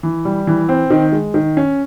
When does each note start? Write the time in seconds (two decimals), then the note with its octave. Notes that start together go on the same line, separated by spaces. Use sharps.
0.03 E3
0.25 G3
0.47 E3
0.69 C4
0.90 D#3
1.12 G#3
1.34 D#3
1.57 C#4